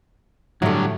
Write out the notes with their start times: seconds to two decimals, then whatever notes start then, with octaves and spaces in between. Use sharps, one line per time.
0.62 A2 D3 F#3 G3 A3